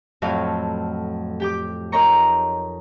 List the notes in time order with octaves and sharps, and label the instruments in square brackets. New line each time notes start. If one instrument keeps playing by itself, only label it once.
[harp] F2 A2 F#3 A3 F4 F5
G4 G5 D6
D#4 A#4 C#5 G5 A#5 C#6